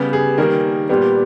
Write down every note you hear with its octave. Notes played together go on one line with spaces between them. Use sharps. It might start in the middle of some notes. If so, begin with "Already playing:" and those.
Already playing: C#3 G3 B3 G4
G#4
D#3 G3 A#3 A#4
A#2 G3 B3 G4